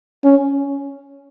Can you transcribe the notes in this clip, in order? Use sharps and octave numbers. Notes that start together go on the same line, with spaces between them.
C#4